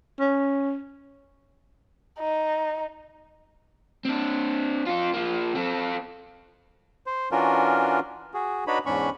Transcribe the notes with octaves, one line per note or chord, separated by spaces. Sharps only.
C#4
D#4
C4 D4
C4 F4
F3 A#3
C4 A4
C5
E3 C#4 D4 F4 F#4 A#4
F#4 G#4
D4 D#4 F#4 B4 C#5 B5
E2 G#2 C#4 D4 B5 C#6